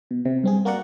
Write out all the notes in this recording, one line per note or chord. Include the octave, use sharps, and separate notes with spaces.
B2
C3
G2 C4 G#4
A#3 F#4 A#4 D5 F#5